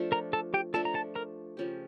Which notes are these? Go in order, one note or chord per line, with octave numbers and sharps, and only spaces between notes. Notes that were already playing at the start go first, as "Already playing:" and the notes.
Already playing: F3 A3 D4
A#4 A#5
A4 A5
G4 G5
F3 A3 D4 A4 A5
A#5
A4 A5
A#4 A#5
C#3 F3 C#4 G4